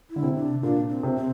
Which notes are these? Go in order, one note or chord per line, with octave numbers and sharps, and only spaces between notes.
E4
D3
C3
D4
A#2 D4
C4
C3
C4